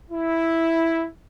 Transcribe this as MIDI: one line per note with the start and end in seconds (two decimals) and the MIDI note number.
0.11 1.07 64